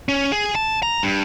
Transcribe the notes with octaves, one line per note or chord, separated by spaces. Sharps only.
C#4
G#4
A5
A#5
G2